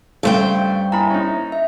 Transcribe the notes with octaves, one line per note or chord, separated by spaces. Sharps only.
G2 C#3 A3 A4 C5 F5 G5
A#3 E4 G#5 A#5 B5
C#4 D#4
E5